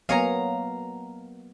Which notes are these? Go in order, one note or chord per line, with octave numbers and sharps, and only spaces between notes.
F#3 A#3 B3 C#5 D#5 F5 G#5 A#5